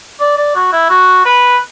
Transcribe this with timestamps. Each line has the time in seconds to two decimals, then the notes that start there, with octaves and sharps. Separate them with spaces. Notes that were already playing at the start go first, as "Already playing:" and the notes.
0.20 D5
0.37 D5
0.55 F#4
0.72 E4
0.90 F#4
1.25 B4